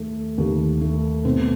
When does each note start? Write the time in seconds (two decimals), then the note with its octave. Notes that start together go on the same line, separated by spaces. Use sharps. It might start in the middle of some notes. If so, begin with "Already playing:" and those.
Already playing: D#2 A3
0.38 D#2
0.81 A3
1.25 B2 C4